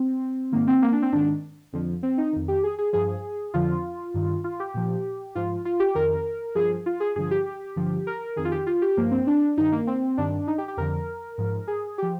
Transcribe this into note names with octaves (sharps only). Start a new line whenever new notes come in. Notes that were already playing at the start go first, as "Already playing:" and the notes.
Already playing: C4
G#2 D#3 A#3
C4
A#3
D4
C4
G#2 D#3 D4
F2 D3 F3
C4
D#4
F2 D#3
G4
G#4
G#4
G2 F3 G#4
F2 D3 F3 F4
G2 D#3
F4
G4
A#2 F3
G#2 F3 F4
F4
G4
F2 D#3 A#4
G2 F3 G#4
F4
G#4
G2 D3 F3 G#4
G4
G2 D3 F3
A#4
F2 D#3 G#4
F4
G4
F4
G4
G2 F3 A#3
C4
D4
G2 D#3 D#4
A#3
C4
G2 D#3 D4
D#4
G4
G4
F2 D3 F3 A#4
G#2 F3
G#4
F3 G4